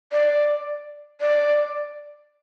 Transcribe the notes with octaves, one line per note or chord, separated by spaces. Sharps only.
D5
D5